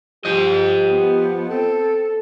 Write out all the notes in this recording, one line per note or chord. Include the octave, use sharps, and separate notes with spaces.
F3 G4 C5 D#5
B3
C4 A4